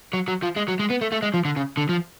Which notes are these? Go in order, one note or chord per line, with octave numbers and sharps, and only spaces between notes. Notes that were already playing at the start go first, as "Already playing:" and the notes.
F#3
F#3
F3
G#3
F#3
G#3
B3
A3
A3
G#3
F3
D3
C#3
D3
F3